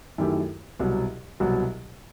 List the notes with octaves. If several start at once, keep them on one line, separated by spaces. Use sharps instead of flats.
F#2 D#3 A3 E4 G4
C2 B2 F#3
C2 B2 F#3